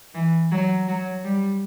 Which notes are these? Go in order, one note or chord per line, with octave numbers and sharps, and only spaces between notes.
E3
F#3
F#3
G3